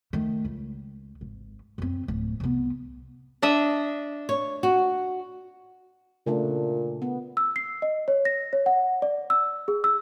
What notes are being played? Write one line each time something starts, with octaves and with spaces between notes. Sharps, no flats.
D#3 A3
C#2
G#1
F#2 C4
D1
C2 B3
D4 D#5 E5
C#5
F#4
A#2 C#3 A3 D4
B3
E6
C7
D#5
C#5
A#6
C#5
F#5
D5
E6
G#4
E6